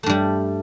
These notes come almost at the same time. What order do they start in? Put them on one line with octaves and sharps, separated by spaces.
A3 G2 G3